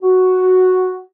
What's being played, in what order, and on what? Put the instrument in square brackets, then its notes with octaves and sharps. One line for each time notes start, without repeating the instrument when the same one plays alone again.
[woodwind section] F#4